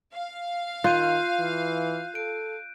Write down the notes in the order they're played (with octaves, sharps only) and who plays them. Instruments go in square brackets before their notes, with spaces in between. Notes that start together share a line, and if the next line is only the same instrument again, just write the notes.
[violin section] F5
[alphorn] D#3 [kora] F4 [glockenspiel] F#6 G6 D#7
[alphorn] E3
[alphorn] A4 [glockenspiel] D7